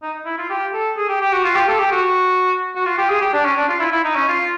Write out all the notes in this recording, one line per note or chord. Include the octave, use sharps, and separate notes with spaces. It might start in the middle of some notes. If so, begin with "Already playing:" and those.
D#4
E4
F4
G4
A4
G#4
G4
G4
F#4
F4
G4
A4
G4
F#4
F#4
F4
G4
G#4
G4
D4
C#4
D4
F4
E4
E4
D#4
C#4
F4